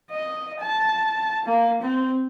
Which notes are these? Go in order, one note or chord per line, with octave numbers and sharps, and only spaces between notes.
D#5
A5
A#3
C4